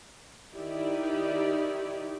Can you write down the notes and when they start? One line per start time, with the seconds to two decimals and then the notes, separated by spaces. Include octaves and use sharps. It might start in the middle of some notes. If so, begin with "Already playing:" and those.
0.54 D#3 D#4 E4 G4 D5